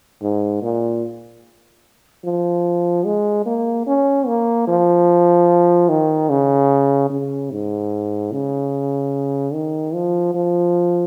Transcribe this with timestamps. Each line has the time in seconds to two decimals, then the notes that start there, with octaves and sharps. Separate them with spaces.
0.22 G#2
0.62 A#2
2.24 F3
3.05 G#3
3.46 A#3
3.86 C#4
4.27 A#3
4.67 F3
5.89 D#3
6.29 C#3
7.10 C#3
7.51 G#2
8.32 C#3
9.53 D#3
9.94 F3
10.34 F3